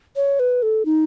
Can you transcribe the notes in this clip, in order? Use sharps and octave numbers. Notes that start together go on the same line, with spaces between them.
C#5
B4
A4
D#4